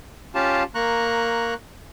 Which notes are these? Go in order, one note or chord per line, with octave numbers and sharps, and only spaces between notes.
C#4 F4 G4 F5 A5
A#3 A#5 C#6 F#6